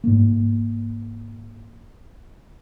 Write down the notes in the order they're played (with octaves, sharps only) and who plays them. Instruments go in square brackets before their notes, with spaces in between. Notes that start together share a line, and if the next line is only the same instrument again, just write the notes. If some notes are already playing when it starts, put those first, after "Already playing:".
[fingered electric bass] G#2 A#3